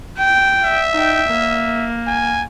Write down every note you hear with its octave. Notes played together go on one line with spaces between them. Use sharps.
G5
E5
D#4 G5
A#3
G#5